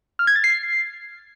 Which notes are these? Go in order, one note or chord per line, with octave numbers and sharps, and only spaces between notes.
F6
G#6
A6
C7